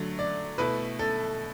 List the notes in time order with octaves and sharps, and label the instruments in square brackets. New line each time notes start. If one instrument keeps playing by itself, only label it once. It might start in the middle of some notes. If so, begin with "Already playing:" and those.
Already playing: [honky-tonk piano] D3 F#3 A3
[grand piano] D5
[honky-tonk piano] B2 A3 E4 [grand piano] B4
[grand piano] A4